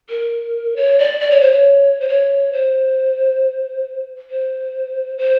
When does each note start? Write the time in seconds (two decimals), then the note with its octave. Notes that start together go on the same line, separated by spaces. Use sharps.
0.10 A#4
0.76 C#5
0.99 D5
1.20 D5
1.31 C#5
1.41 C5
1.52 C#5
2.00 C5
2.09 C#5
2.53 C5
4.30 C5
5.18 C5